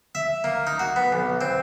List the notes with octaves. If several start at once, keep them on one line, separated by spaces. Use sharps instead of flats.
E5
A#3
D#4
F#4
B3
B1
C4